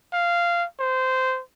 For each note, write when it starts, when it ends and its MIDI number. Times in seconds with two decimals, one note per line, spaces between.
0.13 0.65 77
0.80 1.41 72